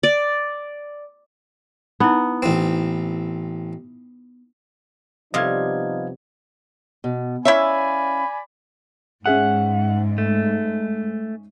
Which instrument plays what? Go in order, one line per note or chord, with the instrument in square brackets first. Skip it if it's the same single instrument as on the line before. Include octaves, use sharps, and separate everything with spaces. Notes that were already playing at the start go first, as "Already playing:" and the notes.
[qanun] D5
[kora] B3 [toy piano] D#4 E4
[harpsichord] A1 C4
[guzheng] C3 G3 [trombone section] F3 B3 D#4 [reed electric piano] D#5 F5 G#6
[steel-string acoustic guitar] B2
[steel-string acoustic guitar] C#4 F5 [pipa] E4 C#5 E5 [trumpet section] D5 G#5 B5
[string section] G#2 [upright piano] C#4 G#4 E5 [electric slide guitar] F#5
[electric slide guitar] A3